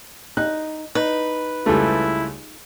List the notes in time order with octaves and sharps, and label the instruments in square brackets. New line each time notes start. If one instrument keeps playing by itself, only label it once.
[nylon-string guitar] D#4 [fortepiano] F#6
[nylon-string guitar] D#4 [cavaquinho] B4
[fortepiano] C#2 G3 A3 [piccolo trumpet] E4